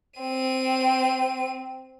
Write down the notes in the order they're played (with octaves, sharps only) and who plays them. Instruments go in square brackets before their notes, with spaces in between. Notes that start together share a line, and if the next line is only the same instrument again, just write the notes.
[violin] C4 D#7